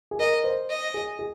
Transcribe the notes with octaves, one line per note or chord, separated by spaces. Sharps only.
G#4
A#4 D#5
C5
D#5
G#4
G#4